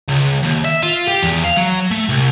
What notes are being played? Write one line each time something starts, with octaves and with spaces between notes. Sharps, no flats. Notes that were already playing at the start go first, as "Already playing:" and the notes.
C#2
D#2
E5
F4
G4
E2
F5
F#3
A3
C2